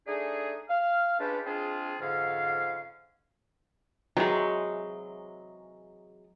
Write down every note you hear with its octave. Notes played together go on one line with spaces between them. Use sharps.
A3 D4 D#4 G#4
F5 F6
G#3 C#4 D4 F4 G4 B4
G#3 C4 D4 F4 G#4
F2 G#2 D3 C#4 F5
C3 E3 F#3 G#3 D#4